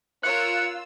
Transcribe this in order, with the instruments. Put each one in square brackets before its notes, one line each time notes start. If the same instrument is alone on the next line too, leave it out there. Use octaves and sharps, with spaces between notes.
[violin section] F4 E6 [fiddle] A#4 C#5 [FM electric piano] F#6 [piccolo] C#7